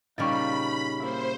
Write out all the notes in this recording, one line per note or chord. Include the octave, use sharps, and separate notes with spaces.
A#2 C#3 G3 D#4 B5 C#6 F6 A6
A#3 E4 C5